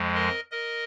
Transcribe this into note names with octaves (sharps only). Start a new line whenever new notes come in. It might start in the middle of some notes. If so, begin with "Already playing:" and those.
Already playing: F2 F3 G#3
A#4 D#5
A#4 D#5